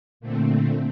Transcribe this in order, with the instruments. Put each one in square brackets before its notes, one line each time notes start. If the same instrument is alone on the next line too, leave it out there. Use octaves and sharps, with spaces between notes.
[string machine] A#2 D3 A3 C4